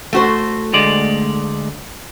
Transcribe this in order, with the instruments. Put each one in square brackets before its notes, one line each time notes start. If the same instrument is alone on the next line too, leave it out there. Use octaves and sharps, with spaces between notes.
[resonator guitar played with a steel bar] A3 F#4 C5
[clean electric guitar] D2 G#3 D5